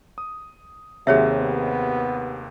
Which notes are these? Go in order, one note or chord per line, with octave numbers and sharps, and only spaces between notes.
D#6
D#2 C3 F#3 G#4 C#5 E5
B3